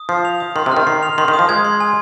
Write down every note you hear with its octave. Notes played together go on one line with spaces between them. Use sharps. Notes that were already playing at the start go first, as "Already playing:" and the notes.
Already playing: D#6
F3 C7
F7
D#6
D#3 C6
C3
F6
D#3
D#3 C7
F7
D#3 C6
D#3
D#6
F3
G#3 G#6
C6
G#5